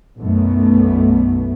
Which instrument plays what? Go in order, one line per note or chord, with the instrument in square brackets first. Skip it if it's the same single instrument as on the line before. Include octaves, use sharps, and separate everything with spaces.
[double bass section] B1 F#2 A3 B3